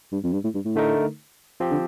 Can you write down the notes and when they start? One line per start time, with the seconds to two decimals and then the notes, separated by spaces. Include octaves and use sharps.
0.12 G2
0.23 F2
0.33 G2
0.44 A2
0.54 G2
0.65 A2
0.75 D3 A3 D#4 A#4
1.60 F3 C4 G4
1.71 D3